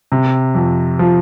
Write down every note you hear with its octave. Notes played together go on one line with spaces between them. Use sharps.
C3
F2
F3